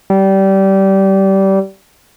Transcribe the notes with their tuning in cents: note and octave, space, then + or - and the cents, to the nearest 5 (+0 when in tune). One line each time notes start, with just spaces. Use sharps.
G3 -20